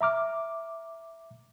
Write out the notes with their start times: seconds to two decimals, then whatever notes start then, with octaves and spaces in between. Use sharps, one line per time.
0.01 E5 A#5 D6 F6